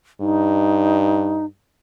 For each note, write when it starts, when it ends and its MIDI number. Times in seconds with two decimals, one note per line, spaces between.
0.21 1.50 43
0.21 1.45 63